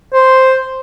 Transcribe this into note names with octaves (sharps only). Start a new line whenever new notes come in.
C5